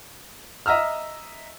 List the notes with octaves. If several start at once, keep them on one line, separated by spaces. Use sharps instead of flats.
D#5 E5 A#5 E6 F6